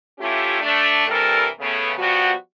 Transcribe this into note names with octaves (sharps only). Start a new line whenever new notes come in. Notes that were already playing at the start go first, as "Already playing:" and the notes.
A3 C#4 E4 F4 G4
A3 D4
G2 C3 E3 G3 A4 A#4
C#3 A3 B3
F3 G3 B3 F#4